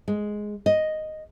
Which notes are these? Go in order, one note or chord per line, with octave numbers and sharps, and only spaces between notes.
G#3
D#5